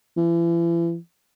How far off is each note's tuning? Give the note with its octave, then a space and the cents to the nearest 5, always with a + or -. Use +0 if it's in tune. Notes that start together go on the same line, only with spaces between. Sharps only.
E3 +40